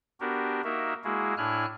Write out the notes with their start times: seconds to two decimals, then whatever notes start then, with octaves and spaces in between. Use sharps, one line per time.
0.20 B3 D4 F#4 G4 A#4
0.64 A#3 D#4 F#4 A#4 E5
1.04 G#3 A#3 E4 F#4 G#4
1.37 A2 D4 E4 G#5 F6 F#6